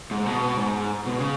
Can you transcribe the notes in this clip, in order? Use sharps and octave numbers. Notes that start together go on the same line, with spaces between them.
G#2
B2
G#2
B2
C#3